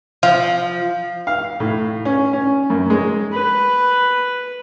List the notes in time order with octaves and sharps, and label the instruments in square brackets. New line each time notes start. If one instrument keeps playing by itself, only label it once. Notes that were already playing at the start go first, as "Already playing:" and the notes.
[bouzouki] F3 [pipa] F5
[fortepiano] F5
A2
C#4
C#4
F#2
G#3
[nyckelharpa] B4